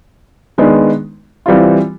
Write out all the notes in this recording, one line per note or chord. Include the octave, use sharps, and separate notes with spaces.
D#3 G#3 B3 D4
E3 G3 C4 F4